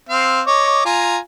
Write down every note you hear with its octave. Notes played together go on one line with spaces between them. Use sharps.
C4 F5
C#5 D#5 D6
F4 G#5 A#5